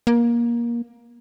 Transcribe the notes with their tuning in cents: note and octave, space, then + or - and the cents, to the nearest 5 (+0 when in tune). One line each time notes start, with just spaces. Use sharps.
A#3 +20